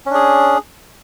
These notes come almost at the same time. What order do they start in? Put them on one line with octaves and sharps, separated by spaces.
C#4 D4 G#4